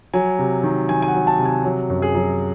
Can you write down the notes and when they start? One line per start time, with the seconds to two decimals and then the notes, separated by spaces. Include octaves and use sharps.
0.14 F#3 G#5
0.39 C3
0.63 D#3
0.89 D#3 G#5
1.02 G#5
1.08 F#5
1.15 F#3
1.27 A5
1.39 C3
1.45 G#5
1.64 F#3
1.90 F#2
2.02 G#4
2.15 F#3